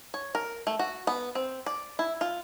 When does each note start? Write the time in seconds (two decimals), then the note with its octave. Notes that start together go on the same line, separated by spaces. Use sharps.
0.14 C#5
0.35 A#4
0.67 A3
0.79 F#4
1.07 B3
1.35 C4
1.66 D5
1.99 E4
2.21 F4